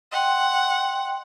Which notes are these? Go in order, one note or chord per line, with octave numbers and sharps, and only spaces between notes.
D#5 F#5 G5 C6